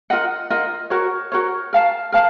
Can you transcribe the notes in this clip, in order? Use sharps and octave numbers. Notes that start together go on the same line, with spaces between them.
F4 A#4 D#5 F#5
F4 A#4 D#5 F#5
F#4 A#4 C#5
F#4 A#4 C#5
A#4 F5 A5
A#4 F5 A5